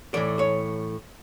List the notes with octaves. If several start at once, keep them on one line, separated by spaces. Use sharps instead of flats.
A2 E3 A3 D5
C#5